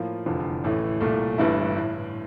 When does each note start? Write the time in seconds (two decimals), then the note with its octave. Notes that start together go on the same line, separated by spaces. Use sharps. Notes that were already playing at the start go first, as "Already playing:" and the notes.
Already playing: A2 F3 A#3 F4
0.26 F1 E2 D3 F3
0.64 A1 A2 E3 A3 E4
1.01 C2 A#2 A3
1.38 G1 G2 E3 A3 E4
1.76 A2